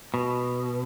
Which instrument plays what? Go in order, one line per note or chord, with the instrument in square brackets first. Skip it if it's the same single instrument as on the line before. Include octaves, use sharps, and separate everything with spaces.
[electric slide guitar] B2